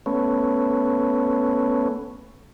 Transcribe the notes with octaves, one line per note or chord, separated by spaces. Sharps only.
A3 B3 C#4